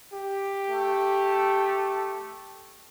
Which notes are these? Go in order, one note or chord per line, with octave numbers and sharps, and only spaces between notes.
G4
A3